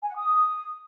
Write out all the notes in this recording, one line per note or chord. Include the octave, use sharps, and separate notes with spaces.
G#5
F#5
D#6